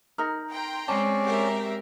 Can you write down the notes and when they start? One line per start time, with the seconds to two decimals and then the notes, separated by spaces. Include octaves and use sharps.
0.18 D#4 A#4
0.51 G5 A#5 C6
0.88 G#3 C4 C#4 D5 A5
1.24 G4 A#4 E5